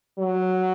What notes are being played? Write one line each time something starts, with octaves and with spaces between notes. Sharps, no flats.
F#3